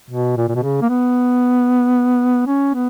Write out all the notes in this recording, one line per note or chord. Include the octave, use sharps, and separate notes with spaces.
B2
A#2
A#2
B2
C#3
A#3
B3
C#4
B3